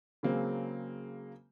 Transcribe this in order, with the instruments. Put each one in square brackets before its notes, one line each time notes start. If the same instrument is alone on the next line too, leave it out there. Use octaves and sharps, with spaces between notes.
[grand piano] C#3 F#3 G#3 A#3 C4